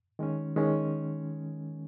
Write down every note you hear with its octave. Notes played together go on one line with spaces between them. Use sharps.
D#3 G#3 C#4
D#3 G#3 C#4